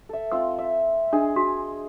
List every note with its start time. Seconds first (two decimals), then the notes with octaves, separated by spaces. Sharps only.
0.09 A4 E5
0.32 C4 F4 E6
0.59 E5
1.13 D4 G#4 D#5
1.36 F#4